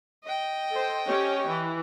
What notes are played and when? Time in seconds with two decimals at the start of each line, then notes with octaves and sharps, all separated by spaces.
0.24 D#5 G5
0.71 A4 C5
1.06 C#4 G4 C#5
1.49 E3